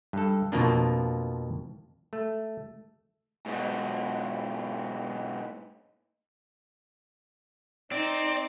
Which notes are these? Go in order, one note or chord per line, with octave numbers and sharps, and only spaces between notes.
G2 A4
F2 B2 F3 A#3 D4
A3
G#2 B2
C4 D#4 D5